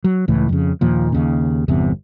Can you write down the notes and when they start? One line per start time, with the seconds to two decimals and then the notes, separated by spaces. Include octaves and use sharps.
0.04 F#3
0.28 C#2 A2 E3
0.49 F2 C#3
0.81 D#2 A#2 F3
1.12 D#2 C#3
1.68 G1 E2 C3